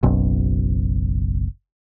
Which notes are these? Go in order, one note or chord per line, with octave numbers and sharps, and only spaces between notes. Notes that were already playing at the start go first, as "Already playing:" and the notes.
F#1 B1